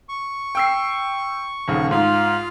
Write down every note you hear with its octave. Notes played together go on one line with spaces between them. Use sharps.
C#6
G5 E6 C7
D#1 D#2 C#3
G#2 F4 F5